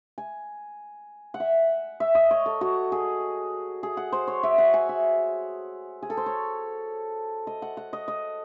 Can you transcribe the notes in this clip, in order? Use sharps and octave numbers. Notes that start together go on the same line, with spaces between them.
G#5
F#5
E5
E5
D#5
C#5
A4
F#4
G#4
G#4
F#5
C5
C#5
E5
F#5
G#5
E5
G#4
A4
C5
C#5
D#5
F#5
F#5
D#5
D#5